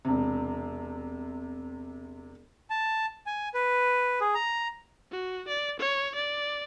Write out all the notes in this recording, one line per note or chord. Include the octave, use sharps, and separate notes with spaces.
E1 C3
A5
G#5
B4
G#4
A#5
F#4
D5
C#5
D5